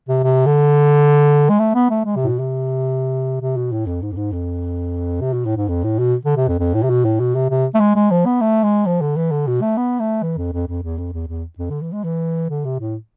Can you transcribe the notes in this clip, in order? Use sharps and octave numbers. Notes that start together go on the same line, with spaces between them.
C3
C3
D3
G#3
A3
B3
A3
G#3
C3
A2
B2
C3
C3
B2
A2
F2
G#2
F2
G#2
F2
C3
B2
A2
G#2
F2
A2
B2
D3
C3
F2
F2
A2
C3
B2
A2
B2
C3
C3
A3
G#3
G#3
F3
B3
A3
G#3
F3
D3
E3
D3
B2
A3
B3
A3
E3
F2
F2
F2
E2
F2
E2
E2
F2
D3
E3
G#3
E3
D3
C3
A2